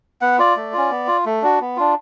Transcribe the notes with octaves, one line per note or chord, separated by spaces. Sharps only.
B3 F#5
F4 D5
A3
C#4 F4
B3
F4
A3
D4 F#4
B3
D4 F4